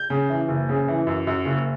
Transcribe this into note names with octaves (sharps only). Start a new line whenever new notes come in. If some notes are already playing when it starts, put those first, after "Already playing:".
Already playing: G6
C#3
E3
F#1
C#3
E3
F#2
F#2
F#1